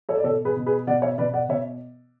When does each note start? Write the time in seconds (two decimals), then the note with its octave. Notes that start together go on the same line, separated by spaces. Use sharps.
0.09 A4 C#5
0.17 D5
0.24 B2 A4 C#5
0.45 G#4 B4
0.56 B2
0.66 G#4 B4
0.87 B2 D5 F#5
1.02 C#5 E5
1.18 B2 B4 D5
1.34 D5 F#5
1.49 B2 C#5 E5